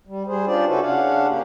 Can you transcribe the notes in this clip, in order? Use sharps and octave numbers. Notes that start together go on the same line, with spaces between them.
G3
G3 G#4 C5
C#4 D4 F4 G4 C5 D5
C#3 C#4 E4 F#4 A4 B4
C#3 C#4 D4 F5 F#5
A#3 C#4 G4